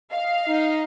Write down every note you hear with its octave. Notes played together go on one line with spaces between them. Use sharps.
D#5 F5
D#4